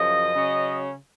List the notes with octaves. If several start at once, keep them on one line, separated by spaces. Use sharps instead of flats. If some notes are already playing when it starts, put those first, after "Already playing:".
Already playing: F#2 C#3 F3 D#5
C#3 F#3 C#4